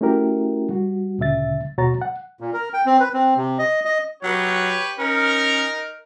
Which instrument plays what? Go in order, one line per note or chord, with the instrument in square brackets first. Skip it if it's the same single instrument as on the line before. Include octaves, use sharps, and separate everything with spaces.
[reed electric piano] A3 C#4 E4 F#4 G4 A#4
G3 F#4
D2 A#2 C#3 E5 A6
D#2 B2 F#4 C#5 A#5 A6
F#5
[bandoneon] A#2
A#4
G5
C4
B4
C4
C3
D#5
D#5
[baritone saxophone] F#3 [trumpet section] G4 B4 C#5
[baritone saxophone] C#4 [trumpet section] D#4 A#4